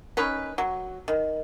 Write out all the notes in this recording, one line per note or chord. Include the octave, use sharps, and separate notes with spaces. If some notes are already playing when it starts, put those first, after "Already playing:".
C#4 D#4 B4
F#3
D#3